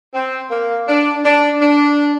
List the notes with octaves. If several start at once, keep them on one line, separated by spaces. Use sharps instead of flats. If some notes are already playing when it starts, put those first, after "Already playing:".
C4
A#3
D4
D4
D4